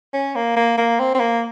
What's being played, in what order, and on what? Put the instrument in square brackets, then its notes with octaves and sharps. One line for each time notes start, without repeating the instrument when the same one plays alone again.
[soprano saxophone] C#4
A#3
A#3
A#3
C4
C4
A#3